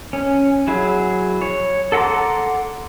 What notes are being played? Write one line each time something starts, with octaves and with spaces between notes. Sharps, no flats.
C#4
F#3 E4 G#4
C#5
A4 F#5 A#5 C6 D6